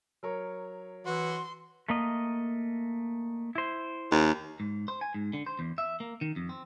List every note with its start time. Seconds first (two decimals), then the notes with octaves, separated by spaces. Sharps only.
0.23 F#3 A#4 C#5
1.06 E3 F#4 C6
1.89 A3 A#3 D#5
3.55 E4 C5
4.12 D#2
4.60 G#2
4.88 C5
5.01 G#5
5.14 G#2
5.33 D3
5.46 C5
5.59 E2
5.78 E5
6.00 A#3
6.21 D#3
6.36 F2
6.49 C4